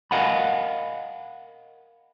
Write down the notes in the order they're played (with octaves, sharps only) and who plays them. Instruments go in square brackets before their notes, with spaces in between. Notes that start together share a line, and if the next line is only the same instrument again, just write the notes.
[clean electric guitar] A#4 D#5 F5 F#5 G#5 B5